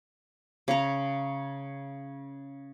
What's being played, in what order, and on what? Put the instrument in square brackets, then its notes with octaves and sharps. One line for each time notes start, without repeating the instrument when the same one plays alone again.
[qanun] C#3 A#5